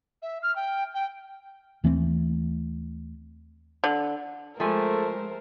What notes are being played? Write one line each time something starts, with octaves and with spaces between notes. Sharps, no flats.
E5
F6
G5
G5
D#2 E3 A3 C4
D3
F3 G#3 A3 A#4 C5 G#5